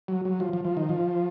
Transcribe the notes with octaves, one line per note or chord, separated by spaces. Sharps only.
F#3
F#3
F3
F3
F3
D#3
F3